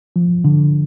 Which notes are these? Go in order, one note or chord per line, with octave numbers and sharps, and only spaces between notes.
F3
D3